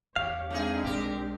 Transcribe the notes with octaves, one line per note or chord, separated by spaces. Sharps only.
E2 G4 C#5 F5
G#3 A3 C4 D4 D#4 G#4
B1 G4 A#4